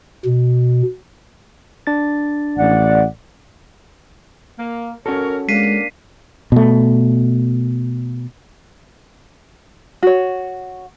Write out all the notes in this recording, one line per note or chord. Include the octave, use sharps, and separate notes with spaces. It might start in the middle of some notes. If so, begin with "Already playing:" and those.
B2
D4 A6
A1 D5 F#5
A#3
C#4 F#4 A4 A#4 C#5
G#3 A#3 D4 B6 C7 D#7
B2 A3
F#4 C#5